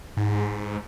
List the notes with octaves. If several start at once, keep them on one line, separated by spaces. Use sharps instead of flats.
G#2